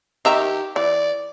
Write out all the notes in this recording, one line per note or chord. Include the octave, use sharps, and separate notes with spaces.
D#3 G4 E5 A#5
E3 D5